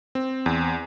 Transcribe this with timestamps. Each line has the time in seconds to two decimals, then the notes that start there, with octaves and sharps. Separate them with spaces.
0.15 C4
0.46 E2